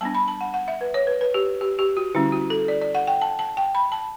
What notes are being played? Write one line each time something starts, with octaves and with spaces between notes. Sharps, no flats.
G3 B3 D4 A5
B5
A5
F#5
F#5
E5
B4
C#5
B4
B4
G4
G4
G4
F#4
D3 G3 C#4 E4
F#4
A4
D5
D5
F#5
G5
A5
A5
G5
B5
A5